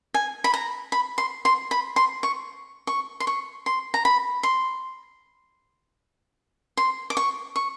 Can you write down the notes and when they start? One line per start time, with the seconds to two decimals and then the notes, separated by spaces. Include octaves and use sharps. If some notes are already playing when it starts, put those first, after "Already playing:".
0.14 G#5
0.44 B5
0.54 A#5
0.92 B5
1.18 C6
1.45 C6
1.71 B5
1.96 C6
2.23 C#6
2.87 C#6
3.20 C6
3.27 C#6
3.66 C6
3.94 A#5
4.05 B5
4.43 C6
6.77 C6
7.10 D6
7.17 C#6
7.56 C#6